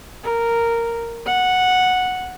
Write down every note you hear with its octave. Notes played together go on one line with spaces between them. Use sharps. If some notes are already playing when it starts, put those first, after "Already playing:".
A#4
F#5